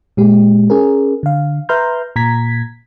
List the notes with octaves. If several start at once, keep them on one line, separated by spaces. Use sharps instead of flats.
A#2 G#3 G4
C#4 G#4 A#4
D3 F5
B4 E5 A#5 C6 F6 G6
A#2 A#5 G#6 B6